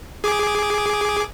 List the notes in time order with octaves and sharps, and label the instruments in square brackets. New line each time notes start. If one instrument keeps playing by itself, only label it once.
[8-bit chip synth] G#4 D6